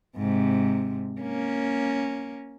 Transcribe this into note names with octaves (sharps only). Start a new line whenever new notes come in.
G#2 C3
A#3 C#4